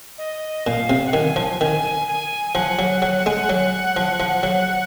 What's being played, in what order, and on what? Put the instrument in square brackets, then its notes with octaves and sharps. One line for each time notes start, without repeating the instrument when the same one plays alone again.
[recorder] D#5
[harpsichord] A#2 [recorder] F5
[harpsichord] C3
[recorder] F#5
[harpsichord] D#3 [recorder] G#5
[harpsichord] F3
[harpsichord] D#3 [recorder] G#5
[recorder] G#5
[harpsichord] F3 [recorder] F#5
[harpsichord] F#3
F#3
G#3
F#3
F3
F3
F#3